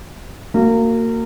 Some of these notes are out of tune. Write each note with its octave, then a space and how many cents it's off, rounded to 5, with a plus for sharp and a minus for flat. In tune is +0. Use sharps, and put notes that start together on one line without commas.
A#3 -30 F#4 +0